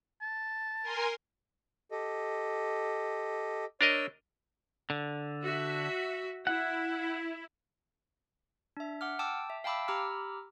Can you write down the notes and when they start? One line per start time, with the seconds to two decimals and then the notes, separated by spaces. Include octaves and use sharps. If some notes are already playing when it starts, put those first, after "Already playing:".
0.21 A5
0.83 A#4 G#5 C6
1.91 G4 A4 D#5
3.81 D4 A#4 C#5 D#5 E6
4.90 D3
5.43 F#4 E5
6.47 E4 F#5
8.77 D4 E5
9.01 F#5 D6 F6
9.19 G5 A5 D6 E6
9.50 E5
9.64 F5 G5 A5 B5 D6 E6
9.88 G4 A#5 B5 D6 E6 F6